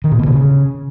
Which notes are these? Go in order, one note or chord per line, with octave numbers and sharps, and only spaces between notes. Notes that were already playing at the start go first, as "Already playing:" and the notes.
D#3
A#2
B2
D3
C#3